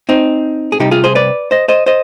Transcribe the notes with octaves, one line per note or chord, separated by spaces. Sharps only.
C4 D#4
G#4
C3 G3 D#4 G4
F4 G#4
G#4 C5
B4 D5
C5 D#5
C5 D#5
C5 D#5